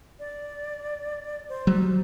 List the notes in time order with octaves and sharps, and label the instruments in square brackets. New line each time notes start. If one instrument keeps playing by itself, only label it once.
[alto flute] D5
C5
[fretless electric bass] F#3 G3